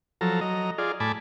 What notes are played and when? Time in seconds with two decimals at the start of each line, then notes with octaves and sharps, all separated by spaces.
0.21 F3 F#3 A4 A#5
0.41 F#3 D#5 A#5
0.78 F4 G#4 D5
1.00 A2 G#5 A5 B5 D6